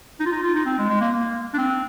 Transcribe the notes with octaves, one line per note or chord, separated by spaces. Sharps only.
D#4
F4
D#4
F4
D#4
C4
G#3
G#3
A#3
A#3
D4
C4